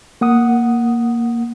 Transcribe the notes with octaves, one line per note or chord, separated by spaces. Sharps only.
A#3 F#5 D#6